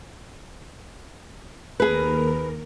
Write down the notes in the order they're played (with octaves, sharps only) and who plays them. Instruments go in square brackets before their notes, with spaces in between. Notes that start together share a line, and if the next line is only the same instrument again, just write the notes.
[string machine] D#2 A#4 [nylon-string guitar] G#4 B4